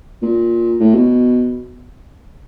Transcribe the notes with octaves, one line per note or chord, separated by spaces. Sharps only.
A#2
A2
B2